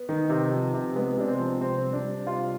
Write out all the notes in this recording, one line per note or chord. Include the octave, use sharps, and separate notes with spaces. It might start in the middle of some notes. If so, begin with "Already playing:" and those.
Already playing: B3
D#3
C3
F3
C3
G#3 B3
C3 D4
C4
F3
C3 C4
G3
D4
G3
C3 F4